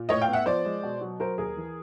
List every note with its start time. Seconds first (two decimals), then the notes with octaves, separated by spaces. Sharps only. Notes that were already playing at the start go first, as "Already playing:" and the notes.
Already playing: A#2
0.09 A2 C#5 D#5
0.21 F5 G5
0.28 B3
0.33 E5 F#5
0.46 F3 C5 D5
0.65 G#3
0.83 B2
1.01 F#3
1.20 F#3 A#4 C5
1.38 D#2 G#4 A#4
1.57 E3